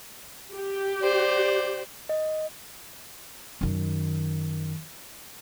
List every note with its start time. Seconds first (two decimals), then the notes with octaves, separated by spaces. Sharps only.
0.54 G4
1.02 C5 D5
2.09 D#5
3.61 F#2 D#3